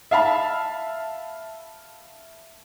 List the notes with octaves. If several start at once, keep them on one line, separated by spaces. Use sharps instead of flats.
E5 F5 A5 B5